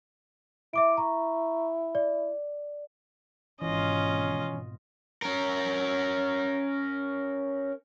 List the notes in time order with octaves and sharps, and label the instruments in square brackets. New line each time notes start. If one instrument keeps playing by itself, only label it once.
[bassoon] E4 [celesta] E5 D6 D7
[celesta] A#5 C#6
D5
[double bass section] G#1 G#2 B2 [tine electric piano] E3 [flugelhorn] C#4 [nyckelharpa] F4 D#5
[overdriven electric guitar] C#4 A#4